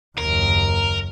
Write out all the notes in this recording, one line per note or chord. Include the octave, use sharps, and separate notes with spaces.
F#1 D#2 A#4